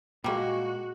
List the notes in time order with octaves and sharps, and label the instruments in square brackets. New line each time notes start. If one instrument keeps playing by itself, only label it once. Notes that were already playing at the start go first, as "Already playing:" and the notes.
[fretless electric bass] A#2 G#3 [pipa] G3 A#3 [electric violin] F#4